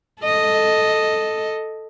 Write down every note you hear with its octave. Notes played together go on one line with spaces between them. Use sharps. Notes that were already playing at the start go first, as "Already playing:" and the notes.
A4 D#5